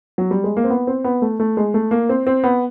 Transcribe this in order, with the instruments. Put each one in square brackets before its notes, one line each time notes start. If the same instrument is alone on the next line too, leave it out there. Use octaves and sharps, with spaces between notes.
[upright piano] F#3
G3
G#3
A#3
C4
B3
C4
B3
A3
A3
G#3
A3
A#3
C4
C4
B3